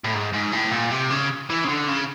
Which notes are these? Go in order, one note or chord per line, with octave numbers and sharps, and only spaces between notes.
A2
G#2
G#2
A2
A#2
C3
C#3
E3
C#3
D3
C#3